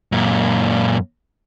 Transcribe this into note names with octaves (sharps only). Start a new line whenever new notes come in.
F#2 A#2